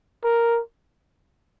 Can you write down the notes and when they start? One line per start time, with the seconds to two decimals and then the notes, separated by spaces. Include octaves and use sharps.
0.24 A#4